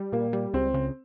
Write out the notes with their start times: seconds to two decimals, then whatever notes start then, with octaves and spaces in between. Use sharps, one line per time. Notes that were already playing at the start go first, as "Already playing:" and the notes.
Already playing: G3
0.12 A#2 A#3
0.33 G3
0.54 C#2 C4
0.74 C#3